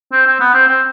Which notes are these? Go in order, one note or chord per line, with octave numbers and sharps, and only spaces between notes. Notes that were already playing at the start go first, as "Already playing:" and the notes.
C4
C4
B3
C4
C4